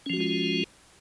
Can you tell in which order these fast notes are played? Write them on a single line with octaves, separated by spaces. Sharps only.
C#4 F3 F#4 G#3 F4